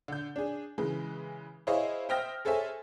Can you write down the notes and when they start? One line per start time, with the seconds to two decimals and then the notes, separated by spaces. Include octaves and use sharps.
0.08 D3 G6
0.36 D4 G#4
0.78 C#3 E3 G#3
1.67 E4 G#4 C5 C#5 D#5 F5
2.09 C5 E5 G5 D#6 F6 A#6
2.45 G#4 A4 C5 C#5 E5 G#5